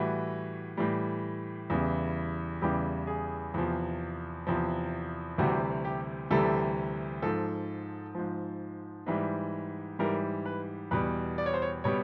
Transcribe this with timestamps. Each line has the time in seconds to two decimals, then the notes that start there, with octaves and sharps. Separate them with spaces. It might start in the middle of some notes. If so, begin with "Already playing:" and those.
Already playing: A2 E3 G3 F#4
0.77 A2 E3 G3
1.70 E2 C#3 E3 G3
2.62 E2 C#3 E3 G3 G4
3.07 G#4
3.54 E2 C3 F3
4.47 E2 C3 F3
5.38 D2 C3 E3 G3 F#4
5.85 G4
6.30 D2 C3 E3 G3 A4
7.22 G#2 F3 A4
8.15 G#2 F3
9.06 G#2 E3 G3
9.99 G#2 E3 G3 A#4
10.46 B4
10.91 E2 B2 G3 B4
11.38 D5
11.46 C#5
11.54 C5
11.62 C#5
11.84 B2 G3 C#5